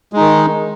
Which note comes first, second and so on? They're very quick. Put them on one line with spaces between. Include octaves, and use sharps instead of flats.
G#3 D#4 D#3